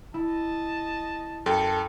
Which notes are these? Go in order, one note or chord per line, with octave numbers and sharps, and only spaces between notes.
E4 D#5 A5
F#2 A4 G5 C#7